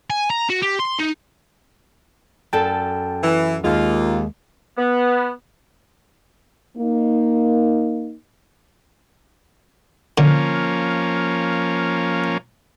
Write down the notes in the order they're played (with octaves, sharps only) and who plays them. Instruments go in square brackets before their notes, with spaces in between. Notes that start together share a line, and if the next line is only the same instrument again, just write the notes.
[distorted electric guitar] G#5
A#5
F#4
G4
C6
D#4
[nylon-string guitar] F#2 A4 D5 [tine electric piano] G5 A5
[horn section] E3
[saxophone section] D#2 [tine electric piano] G#3 [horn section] A#3 F4
[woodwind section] B3
[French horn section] A#3 D#4
[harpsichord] D3 [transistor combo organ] F3 A#3 C#4